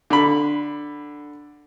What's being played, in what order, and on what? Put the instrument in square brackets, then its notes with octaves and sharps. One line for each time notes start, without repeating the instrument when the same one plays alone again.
[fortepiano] D3 B5